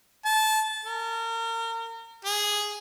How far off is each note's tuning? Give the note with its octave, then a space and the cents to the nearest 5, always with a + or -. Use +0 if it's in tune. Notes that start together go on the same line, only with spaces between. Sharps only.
A5 -20
A#4 -35
G#4 +0